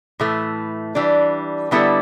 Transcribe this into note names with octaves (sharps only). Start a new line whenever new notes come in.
A2 E3 A3
E3 G3 D4
D3 G3 B3 E4 A4